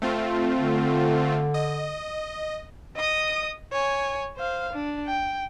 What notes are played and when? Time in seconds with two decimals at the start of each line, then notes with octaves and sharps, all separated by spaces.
0.02 A3 C4 F4
0.58 D3
1.54 D#5
2.96 D#5 D#6
3.72 C#5 G#5
4.37 C5 F5
4.73 D4
5.07 G5